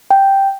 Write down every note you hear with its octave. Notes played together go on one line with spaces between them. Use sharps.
G5